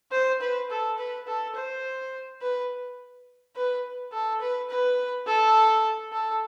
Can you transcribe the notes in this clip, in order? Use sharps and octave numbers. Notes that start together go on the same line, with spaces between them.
C5
B4
A4
B4
A4
C5
B4
B4
A4
B4
B4
A4
A4